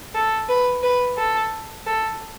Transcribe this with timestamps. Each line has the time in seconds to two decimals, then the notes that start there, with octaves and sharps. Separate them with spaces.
0.14 A4
0.49 B4
0.83 B4
1.17 A4
1.86 A4